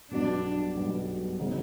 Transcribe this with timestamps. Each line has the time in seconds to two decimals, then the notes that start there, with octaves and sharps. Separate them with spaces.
0.11 B1 B2 G3 B3 D4
0.75 B1 B2 G3 B3
1.39 C#3 F#3 B3 D#4